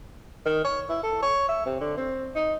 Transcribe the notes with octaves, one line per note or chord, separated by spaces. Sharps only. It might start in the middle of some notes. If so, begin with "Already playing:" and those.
D#3
C#5
E4
A4
C#5
E5
C3
D3
C4
D#4